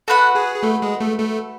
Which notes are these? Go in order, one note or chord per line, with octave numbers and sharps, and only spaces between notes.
F#4 A4 B4 F#5 A5
G#4 G#5
G#4
A3 A4
G#3 G#4
A3 A4
A3 A4